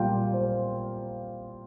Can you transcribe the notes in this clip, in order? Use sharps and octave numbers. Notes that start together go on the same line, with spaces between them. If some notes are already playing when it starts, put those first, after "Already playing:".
Already playing: A#2 G3 A#3 F4 G5
C5